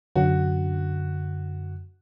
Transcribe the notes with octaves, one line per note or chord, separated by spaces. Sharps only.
F#2 D3 F#4